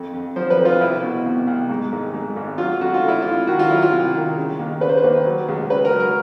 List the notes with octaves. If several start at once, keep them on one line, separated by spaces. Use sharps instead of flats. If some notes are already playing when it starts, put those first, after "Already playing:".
Already playing: F2
F2
F3 C5
B4
F2
F4
C2 E4
B2
C2
C2
G#2
G#1
G#2
G#1
F#3 F4
F2 F#4
F4
D3
E4
F4
F2
D#3 F#4
F4
F#3 E4
F4
C2
D#3
C#3
D#2
C#3 B4
C5
B4
D#2
F#3
C#2
C#3 B4
A#4
F#3
A#4